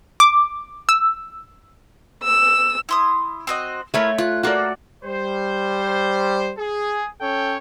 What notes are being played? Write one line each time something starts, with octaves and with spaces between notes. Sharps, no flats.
D6
E6
E6
E4 C6 D#6
C4 F#4 D#5
A3 E4 F4 A#4 C#5 B5
F4 F#6
A#3 F#4 A4 D5 F#6
G3 C5
G#4
C#4 A4 C#5 G5